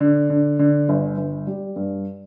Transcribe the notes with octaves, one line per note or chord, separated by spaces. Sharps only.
D3
D3
D3
G1
G1
G3
G2